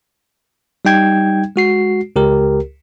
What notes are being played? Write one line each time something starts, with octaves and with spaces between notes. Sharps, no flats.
G3 D#4 G5 G#6
G#3 F#4 C7
C#2 G4 A#4